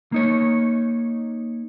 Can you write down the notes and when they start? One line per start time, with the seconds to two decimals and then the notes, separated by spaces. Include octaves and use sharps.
0.12 A#3 D#4 C#5